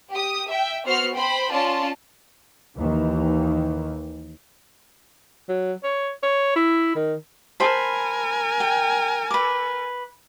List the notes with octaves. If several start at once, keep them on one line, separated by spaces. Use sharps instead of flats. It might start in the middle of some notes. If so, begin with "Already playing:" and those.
G4 D#6
E5 G5
B3 F#4 C5 F6 C7
C5 G5 B5
C#4 F4 D5 A5
D#2 D#3 E3
F#3
C#5
C#5
E4
D#3
A#4 C5 G#5 A5 B5
G5
B4 D6